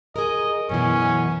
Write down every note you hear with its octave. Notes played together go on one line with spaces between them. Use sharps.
G#4 A#4 D#5
F#2 B2 E3 C#4